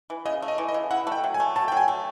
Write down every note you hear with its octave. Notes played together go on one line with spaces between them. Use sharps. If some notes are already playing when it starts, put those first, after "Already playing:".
E3
C#3 D#5
A3
D#5
E3
D#5
C#3
E4 F#5
A3
G5
F#3
G#5
A3
F#3 A5
G5
F#3
G#5
A3